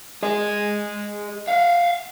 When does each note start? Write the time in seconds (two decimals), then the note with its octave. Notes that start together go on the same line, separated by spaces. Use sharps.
0.23 G#4 D#5
1.47 E5 F5